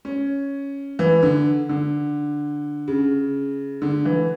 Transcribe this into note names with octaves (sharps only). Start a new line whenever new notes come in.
C#4
E3
D3
D3
C#3
D3
E3